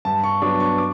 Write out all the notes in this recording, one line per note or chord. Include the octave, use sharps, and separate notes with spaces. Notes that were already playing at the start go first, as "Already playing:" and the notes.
G2 A5
C#6
F#3 B3 D4 D6
C#6
D6